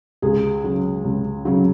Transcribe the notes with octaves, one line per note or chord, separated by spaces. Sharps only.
C#2 G#4
C#3 F#3
C#2
C#3 F#3